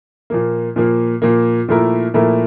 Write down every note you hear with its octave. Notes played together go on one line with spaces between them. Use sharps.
A#2 F3 A#3
A#2 F3 A#3
A#2 F3 A#3
A#2 F3 A3 E4 A#4
A#2 F3 A3 E4 A#4